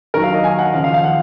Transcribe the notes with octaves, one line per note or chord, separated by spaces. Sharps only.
D#2 D#3 F#3 A#4
F5
D#5
G#5
F#5
D#2 C#3 F3 F5
F5
F5
F#5